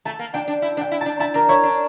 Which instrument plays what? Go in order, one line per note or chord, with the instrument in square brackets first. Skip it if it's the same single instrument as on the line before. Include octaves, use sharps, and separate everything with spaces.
[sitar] A3 [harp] A5
[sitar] A#3
[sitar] D4 [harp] G5
[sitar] D4
E4
D4
[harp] G5
[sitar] E4
[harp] A5
[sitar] D4
[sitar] E4 [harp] A5
[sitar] D4 [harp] A#4
[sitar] E4 [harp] C#5
[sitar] D4